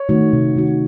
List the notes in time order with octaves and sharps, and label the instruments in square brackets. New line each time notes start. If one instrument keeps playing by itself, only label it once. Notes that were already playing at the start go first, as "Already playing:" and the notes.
Already playing: [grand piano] C#5
[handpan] D#3 A3 D#4 F#4
C3
D#3 A3 D#4 F#4